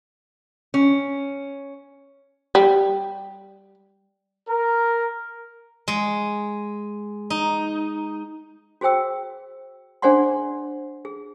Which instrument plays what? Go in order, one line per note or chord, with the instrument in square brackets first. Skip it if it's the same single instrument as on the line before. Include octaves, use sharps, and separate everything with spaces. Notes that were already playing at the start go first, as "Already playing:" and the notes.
[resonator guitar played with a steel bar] C#4
[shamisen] G3
[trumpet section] A#4
[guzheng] G#3
D#4
[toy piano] F#4 G#4 C5 G5 E6
D4 G#4 C5 D5 F#5 C6
G#4